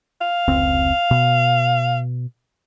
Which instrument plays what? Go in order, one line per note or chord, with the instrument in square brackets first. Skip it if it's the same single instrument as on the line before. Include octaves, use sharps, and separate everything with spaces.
[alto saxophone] F5
[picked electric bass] F1 C#2 C4
B2